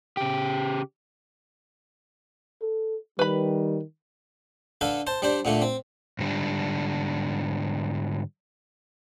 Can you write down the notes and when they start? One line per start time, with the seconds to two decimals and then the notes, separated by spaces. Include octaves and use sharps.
0.17 C#3 G4
2.62 A4
3.19 D#3 G3 B4 B5
4.81 D3 A4 B4 F5
5.07 C5 A5
5.22 G3 D4 C5
5.45 A#2 D3 A3
5.61 C4
6.19 G#2 D3 G3 D4